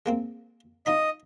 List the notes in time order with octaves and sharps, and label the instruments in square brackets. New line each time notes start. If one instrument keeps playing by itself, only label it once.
[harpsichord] G#3 A#3 C4
[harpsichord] F3 D#4 B5 [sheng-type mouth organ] D#5